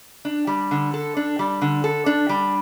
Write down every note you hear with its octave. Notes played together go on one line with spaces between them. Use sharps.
D4
G3
D3
A4
D4
G3
D3
A4
D4
G3